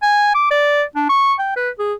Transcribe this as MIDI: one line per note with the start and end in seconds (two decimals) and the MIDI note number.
0.02 0.33 80
0.34 0.50 86
0.51 0.83 74
0.95 1.05 62
1.09 1.34 85
1.39 1.53 79
1.56 1.70 71
1.79 1.93 68